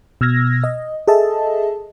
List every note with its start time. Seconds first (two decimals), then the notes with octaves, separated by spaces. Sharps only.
0.21 B2 E6 F6 G#6 A#6
0.64 D#5
1.08 G#4 A4 D#5 E5 A5